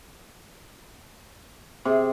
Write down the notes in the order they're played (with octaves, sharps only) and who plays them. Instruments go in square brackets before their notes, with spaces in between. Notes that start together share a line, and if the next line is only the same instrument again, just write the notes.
[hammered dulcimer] C3 [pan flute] G#4